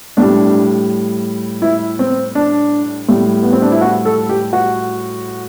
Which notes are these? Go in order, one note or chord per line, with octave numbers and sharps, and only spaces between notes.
A2 G3 D4
E4
C4
D4
A2 G3
B3
C4
D4
E4
F#4
A4
G4
F#4